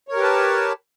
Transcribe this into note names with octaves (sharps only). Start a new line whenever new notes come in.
G4 A#4 B4 C#5 A5